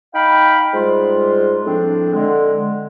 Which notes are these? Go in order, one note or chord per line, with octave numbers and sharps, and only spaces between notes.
D#4 F5 G5 B5
G#2 G3 G#3 F4
A2 F3 C4 D4
D3 G#3